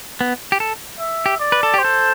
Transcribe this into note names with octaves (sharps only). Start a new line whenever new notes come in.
B3
G4
A4
E5
G4
D5
B4
A4
G4 C5
A4